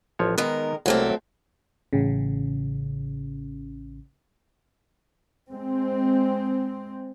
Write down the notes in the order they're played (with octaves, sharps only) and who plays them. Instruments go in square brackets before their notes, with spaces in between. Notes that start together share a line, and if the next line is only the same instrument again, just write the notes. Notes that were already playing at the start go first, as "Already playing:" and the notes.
[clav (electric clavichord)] A1 F3 C#5
[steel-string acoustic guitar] D#3 G#3 A#4 [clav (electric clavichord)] B3
[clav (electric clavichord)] C2 A#3 [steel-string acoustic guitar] F#3 A3 C4
[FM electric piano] A1 C#3
[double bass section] G#3 C4